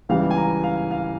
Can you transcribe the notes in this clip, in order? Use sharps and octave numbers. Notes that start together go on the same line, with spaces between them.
C#2 C#3 E3 G3 F5
G#5
A#5
F5
F5